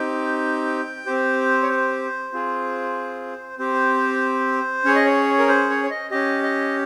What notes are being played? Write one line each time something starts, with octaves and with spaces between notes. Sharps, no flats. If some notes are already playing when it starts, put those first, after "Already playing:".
Already playing: C4 D#4 G4 G5
C4 G4 C5
C#5
C5
C4 F4 G#4
C4 G4 C5
C#4 G#4 C#5
D#5
C#5
A#4
C5
C#5
C#5
D#5
C#4 G4 D#5
D#5